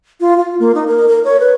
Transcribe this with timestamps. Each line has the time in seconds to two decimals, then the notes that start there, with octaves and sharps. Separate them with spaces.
0.21 F4
0.38 F4
0.59 A#3
0.75 D#4
0.87 A#4
1.08 A#4
1.25 C#5
1.40 B4